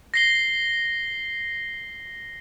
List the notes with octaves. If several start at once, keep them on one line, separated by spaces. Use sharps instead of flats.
A#6 C7 G7